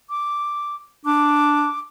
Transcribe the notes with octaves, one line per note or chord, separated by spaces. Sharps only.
D6
D4 D6